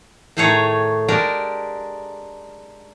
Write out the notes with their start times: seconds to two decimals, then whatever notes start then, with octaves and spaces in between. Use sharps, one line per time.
0.37 A2 D#3 A3 G#4 C#5 A#5
1.08 G#3 D4 G4 A#4